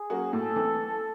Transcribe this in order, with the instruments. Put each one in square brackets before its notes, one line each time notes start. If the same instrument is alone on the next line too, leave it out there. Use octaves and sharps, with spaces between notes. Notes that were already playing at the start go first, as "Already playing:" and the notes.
Already playing: [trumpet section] G#4
[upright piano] F#3 A#3 C#4 F#4
[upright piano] A2 [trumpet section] A4
[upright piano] E3 A3 C4